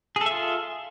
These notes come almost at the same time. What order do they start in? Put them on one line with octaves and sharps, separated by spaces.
G#4 A4 E5 F4